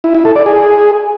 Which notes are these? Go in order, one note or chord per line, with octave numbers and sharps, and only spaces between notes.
E4
E4
A4
D5
G#4